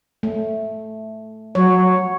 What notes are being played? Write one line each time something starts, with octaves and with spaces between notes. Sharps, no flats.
A3
F#3 C#5